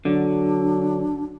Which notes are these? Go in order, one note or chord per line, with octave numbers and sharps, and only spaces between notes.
D3 F#3 D4